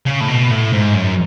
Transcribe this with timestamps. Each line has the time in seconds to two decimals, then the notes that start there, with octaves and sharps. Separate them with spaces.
0.06 C#3
0.21 A2
0.28 B2
0.51 A2
0.73 G#2
0.94 F#2